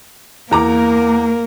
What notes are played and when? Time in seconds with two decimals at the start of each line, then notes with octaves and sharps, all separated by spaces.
0.51 E2 A#3 A#4 A#5 D6